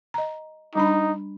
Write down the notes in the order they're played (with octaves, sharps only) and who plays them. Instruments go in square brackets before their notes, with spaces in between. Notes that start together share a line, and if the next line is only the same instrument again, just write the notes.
[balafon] D#5 A#5
[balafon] G3 D4 B5 [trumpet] D#4